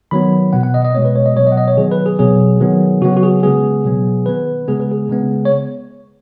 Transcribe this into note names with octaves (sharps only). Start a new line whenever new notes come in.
D#3 F#3 B3 B5
B2 B3 F#5
F#5
D#5
D#5
B2 G#3 B3 C#5
B4
C#5
D#5
B2 F#3 B3 C#5
D#5
F#5
D#5
C#5
D#3 F#3 B3 G#4
B4
G#4
B2 F#3 B3 G#4
D#3 F#3 B3
C#3 F#3 B3 F#4
F#4
G#4
C#3 G#3 B3 G#4
B2 F#3 B3
D#3 B3 B4
C#3 G#3 B3 G#4
B4
G#4
C#3 G#3 B3
C#5